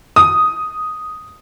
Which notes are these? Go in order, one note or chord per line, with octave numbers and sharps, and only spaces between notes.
D#6